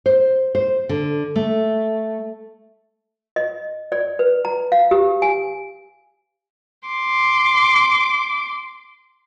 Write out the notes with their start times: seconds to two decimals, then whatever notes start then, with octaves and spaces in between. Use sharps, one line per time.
0.06 C5
0.55 C5
0.89 D3
1.36 A3
3.36 D#5
3.92 D5
4.19 B4
4.45 A#5
4.72 F5
4.91 G4
5.22 G#5
6.89 C6 D6